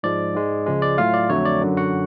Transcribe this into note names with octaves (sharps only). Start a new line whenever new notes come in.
G#2 F3 G#3 D5
G#2 G#3
C#2 C#3 F3 G#3
D5
A2 F#3 A3 F4 F5
D5
F2 D3 F#3 A3 C#5
D5
F#2 D3 F#3
F#4 F#5